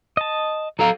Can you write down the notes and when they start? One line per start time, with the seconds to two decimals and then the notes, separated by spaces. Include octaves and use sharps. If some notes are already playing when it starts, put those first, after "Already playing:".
0.17 D#5 A5
0.79 F#3 A4 F5 A#5